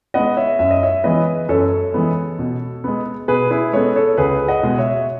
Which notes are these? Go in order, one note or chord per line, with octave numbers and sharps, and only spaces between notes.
G#3 B3 D#5 F#5
C#5 E5
F#2 E5
D#5
C#5 E5
E3 G#3 B3 B4 D#5
F#2 A4 C#5
E3 G#3 B3
B2
G#3 B3
B2 G#4 B4
E4 G#4
G#3 B3 A4 C#5
A4 C#5
C#2 G#4 B4
D#5 F#5
B2 G#3
C#5 E5